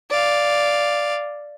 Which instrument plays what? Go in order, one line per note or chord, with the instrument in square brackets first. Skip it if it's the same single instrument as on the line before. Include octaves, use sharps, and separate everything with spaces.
[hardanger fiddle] D5 F5